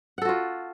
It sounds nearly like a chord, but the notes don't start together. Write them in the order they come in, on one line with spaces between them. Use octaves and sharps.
F#5 A4 F#4 F4